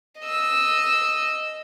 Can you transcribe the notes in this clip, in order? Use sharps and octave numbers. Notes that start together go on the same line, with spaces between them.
D#5 E6